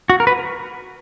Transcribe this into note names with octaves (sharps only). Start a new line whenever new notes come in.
F#4
A#4
B4